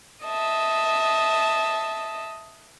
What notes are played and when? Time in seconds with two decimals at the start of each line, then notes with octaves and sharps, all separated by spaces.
0.24 D#5 E5 A5